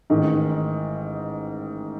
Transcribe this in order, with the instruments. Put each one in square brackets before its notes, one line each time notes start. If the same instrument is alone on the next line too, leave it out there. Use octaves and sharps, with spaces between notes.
[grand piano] A1 G#2 D#3 G#3